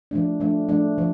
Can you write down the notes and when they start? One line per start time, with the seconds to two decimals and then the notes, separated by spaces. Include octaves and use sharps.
0.11 F3 A3 D4
0.40 F3 A3 D4
0.68 F3 A3 D4
0.98 F3